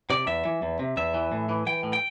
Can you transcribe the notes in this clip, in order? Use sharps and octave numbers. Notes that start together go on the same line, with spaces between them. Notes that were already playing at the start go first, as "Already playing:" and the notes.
C3 D5
E2 E5
E3
E2
C3
E2 E5
E3
A2
E3
E3 G5
A2
G5